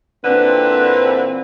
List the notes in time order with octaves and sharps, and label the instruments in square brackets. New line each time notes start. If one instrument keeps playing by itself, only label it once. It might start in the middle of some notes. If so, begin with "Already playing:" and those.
[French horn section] A#2 E3 C4 [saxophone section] D3 B4